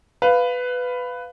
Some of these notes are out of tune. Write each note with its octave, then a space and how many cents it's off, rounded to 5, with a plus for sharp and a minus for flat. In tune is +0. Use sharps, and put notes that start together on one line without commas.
B4 +10 F5 +0